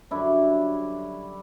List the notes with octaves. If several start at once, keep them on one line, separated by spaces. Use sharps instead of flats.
F#2 D3 G3 D4 E4